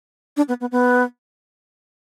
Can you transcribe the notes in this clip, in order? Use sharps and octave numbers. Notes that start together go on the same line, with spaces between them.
D4
B3
B3
B3